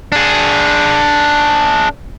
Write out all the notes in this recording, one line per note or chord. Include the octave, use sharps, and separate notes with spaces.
D4 G#4